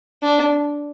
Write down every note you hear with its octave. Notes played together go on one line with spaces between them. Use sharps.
D4